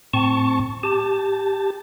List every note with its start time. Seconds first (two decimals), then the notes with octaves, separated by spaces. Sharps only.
0.13 A2 C4 A5 C#6
0.83 G4 A5